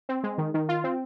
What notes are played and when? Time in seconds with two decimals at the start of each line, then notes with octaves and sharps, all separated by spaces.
0.09 C4
0.24 G#3
0.38 D#3
0.54 D#3
0.69 F4
0.84 C4